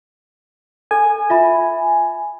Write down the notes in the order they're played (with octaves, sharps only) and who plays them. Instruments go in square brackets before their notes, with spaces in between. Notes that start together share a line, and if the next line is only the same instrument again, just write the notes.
[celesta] A4 [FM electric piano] G#5
[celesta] F4 E5 B5